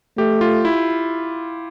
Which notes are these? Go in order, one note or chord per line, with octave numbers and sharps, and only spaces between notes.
A3 G4
F4
E4